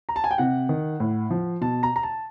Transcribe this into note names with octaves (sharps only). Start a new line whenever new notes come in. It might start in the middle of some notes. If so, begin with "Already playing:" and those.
A#5
A5
G#5
G5
C3 F#5
D#3
A2
F3
B2 A5
A#5
A#5
A5